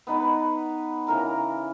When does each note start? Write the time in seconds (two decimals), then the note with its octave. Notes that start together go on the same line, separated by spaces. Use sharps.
0.07 B3 D#4 B4
1.07 C#3 E3 A#4 A#5